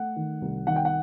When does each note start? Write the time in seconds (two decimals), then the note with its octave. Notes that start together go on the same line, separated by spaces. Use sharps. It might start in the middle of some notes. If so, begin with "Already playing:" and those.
Already playing: A3 F#5
0.16 D#3
0.42 C2
0.67 D#3 F#5
0.76 G5
0.85 F#5